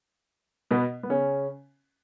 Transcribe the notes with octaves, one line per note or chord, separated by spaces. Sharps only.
B2 B3
B3
C#3 C#4